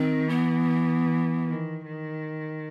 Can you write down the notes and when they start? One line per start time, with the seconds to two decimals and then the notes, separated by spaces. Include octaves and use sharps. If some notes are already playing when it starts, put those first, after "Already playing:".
Already playing: D#3 C4
0.28 E3 B3
1.46 D#3
1.86 D#3